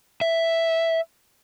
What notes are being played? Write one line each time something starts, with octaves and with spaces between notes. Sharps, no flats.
E5